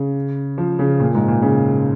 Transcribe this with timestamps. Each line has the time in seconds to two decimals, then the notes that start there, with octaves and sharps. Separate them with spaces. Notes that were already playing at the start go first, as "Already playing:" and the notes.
Already playing: C#3
0.58 F3
0.79 C#3
1.00 A#2
1.15 G#2
1.28 A#2
1.42 C#3